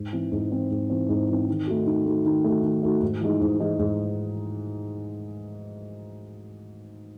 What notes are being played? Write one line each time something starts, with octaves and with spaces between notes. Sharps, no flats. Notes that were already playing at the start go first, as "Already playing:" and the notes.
Already playing: G#2
E3 C4
G#2
E3 C4
G#2
E3 C4
G#2
E3 C4
D#3
A3 D#4 F#4
D#3
A3 D#4 F#4
D#3
A3 D#4 F#4
D#3
A3 D#4 F#4
G#2
E3 G#3 D#4
G#2
E3 G#3 D#4
G#2